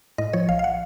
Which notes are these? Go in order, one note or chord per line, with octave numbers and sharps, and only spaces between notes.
A2 D#5
F3 C#5
A#1 F5
F5
F#5